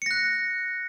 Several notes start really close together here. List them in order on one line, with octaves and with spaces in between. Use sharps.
C#7 A#6 F#6